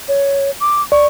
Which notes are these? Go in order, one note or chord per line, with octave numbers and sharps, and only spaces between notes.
C#5
D6
D5 C#6